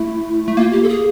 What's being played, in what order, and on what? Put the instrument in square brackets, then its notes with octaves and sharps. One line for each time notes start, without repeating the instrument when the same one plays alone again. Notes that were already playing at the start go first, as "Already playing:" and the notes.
Already playing: [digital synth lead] A3 [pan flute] E4
[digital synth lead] A3
[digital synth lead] A#3 [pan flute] F4
[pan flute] G4
A4
G#4